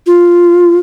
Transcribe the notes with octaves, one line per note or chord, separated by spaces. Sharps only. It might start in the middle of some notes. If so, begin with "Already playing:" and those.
F4